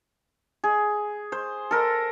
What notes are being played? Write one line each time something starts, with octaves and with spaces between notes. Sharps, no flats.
G#4
C5
A4 A#4